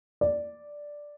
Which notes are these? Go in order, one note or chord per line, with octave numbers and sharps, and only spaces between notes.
D5